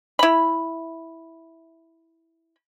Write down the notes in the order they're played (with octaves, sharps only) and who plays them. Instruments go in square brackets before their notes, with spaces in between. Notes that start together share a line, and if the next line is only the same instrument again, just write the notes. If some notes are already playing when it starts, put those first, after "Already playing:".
[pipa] E4 B5